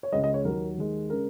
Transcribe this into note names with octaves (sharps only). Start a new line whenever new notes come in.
C#5
C#2 C#3 G#3 D#5
D#5
C#5
D#2 D#3 F#3 A#4
D#2 D#3 G#3
C#3 G#3 A#4